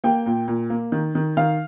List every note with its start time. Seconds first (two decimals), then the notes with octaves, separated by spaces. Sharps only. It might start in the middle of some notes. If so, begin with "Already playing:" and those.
0.04 A#3 G5
0.26 A#2
0.48 A#2
0.70 A#3
0.92 D#3
1.15 D#3
1.37 D#3 F5